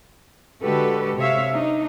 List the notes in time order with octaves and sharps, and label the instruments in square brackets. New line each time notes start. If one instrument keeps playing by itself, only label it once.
[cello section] D3 G#3 F#4 G4 A4 B4
C3 C#5 E5 F5
D4 D#4